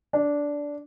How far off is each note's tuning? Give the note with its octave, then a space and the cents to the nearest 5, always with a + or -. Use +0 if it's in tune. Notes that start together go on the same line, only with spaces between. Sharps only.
D4 -10